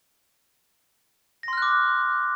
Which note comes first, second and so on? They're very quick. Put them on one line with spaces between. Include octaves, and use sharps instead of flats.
A#6 C6 F6 F#6 D6